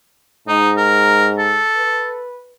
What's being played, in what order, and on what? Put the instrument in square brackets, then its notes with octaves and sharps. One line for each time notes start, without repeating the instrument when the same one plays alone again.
[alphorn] G#2 [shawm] D#4
[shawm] A#4
A4
[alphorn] B4